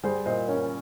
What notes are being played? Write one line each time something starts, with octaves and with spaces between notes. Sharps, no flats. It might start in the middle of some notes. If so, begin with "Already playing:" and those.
G3 G#4 C5
A#2 C5 D#5
C#4 A#4 C#5